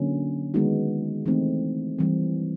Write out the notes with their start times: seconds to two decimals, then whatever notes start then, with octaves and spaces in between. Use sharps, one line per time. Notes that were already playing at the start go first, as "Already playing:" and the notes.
Already playing: D3 F#3 A#3 C#4
0.54 D#3 G#3 B3 D#4 F#4
1.26 E3 A3 C4 D#4
1.99 E3 G3 C4